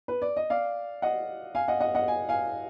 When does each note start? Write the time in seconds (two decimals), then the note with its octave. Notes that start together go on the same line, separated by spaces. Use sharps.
0.08 B4
0.22 D5
0.37 D#5
0.50 D5 F5
1.02 D#5 F#5
1.55 F5 G#5
1.68 D#5 F#5
1.81 D#5 F#5
1.95 D#5 F#5
2.08 G#5
2.29 F5 G#5